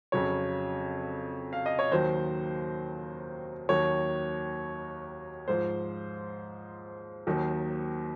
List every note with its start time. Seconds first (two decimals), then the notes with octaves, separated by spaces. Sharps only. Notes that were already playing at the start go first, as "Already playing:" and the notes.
0.12 F2 C#3 F#3 C#5
1.53 F5
1.66 D#5
1.79 C#5
1.91 D#2 D#3 F#3 C5
3.69 D#2 D#3 F#3 C#5
5.48 G#2 F3 C5
7.27 D#2 D#3 F#3